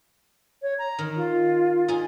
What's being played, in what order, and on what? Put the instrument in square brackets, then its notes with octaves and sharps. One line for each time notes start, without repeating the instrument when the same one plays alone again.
[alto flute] C#5
A#5
[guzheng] D#3
[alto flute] F4
[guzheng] D#4 G#4